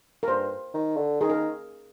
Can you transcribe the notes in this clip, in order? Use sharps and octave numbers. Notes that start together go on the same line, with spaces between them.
A#4
G2 C5
D#3
D3
D#3 G#4
A#4